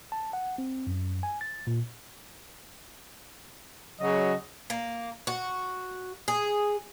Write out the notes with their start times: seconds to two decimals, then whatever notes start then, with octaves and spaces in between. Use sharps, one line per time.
0.12 A5
0.33 F#5
0.58 C4
0.87 F#2
1.23 G#5
1.41 A6
1.67 A#2
4.00 C#3 F#3 D#5
4.70 A#3
5.27 F#4
6.28 G#4